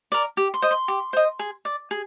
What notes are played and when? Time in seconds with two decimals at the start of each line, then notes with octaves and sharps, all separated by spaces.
0.12 A#4 D5
0.37 G4
0.54 C6
0.62 C5 D#5
0.71 C6
0.88 G4
1.13 C5 D#5
1.39 G#4
1.65 D5
1.91 G#4